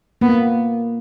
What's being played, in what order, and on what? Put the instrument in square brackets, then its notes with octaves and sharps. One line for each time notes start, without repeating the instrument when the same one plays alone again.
[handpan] A#3 [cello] B3